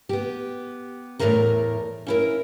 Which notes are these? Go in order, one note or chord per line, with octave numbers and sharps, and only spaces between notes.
B3 G4
E2 A2 C#3 A3 A#4 A#5
C#4 E4 A#4